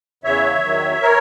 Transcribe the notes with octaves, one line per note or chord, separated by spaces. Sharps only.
E2 C#3 E3 C#5 E5
E2 D#3 F#3
E3 A#4 C#5